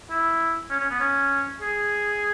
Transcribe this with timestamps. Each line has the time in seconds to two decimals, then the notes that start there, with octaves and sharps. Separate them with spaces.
0.10 E4
0.70 C#4
0.80 C#4
0.90 B3
1.00 C#4
1.61 G#4